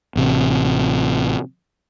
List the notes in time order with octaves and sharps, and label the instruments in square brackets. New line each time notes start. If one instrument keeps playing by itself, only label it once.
[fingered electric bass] A1 C3